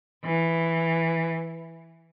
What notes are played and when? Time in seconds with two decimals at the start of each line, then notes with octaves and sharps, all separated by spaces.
0.25 E3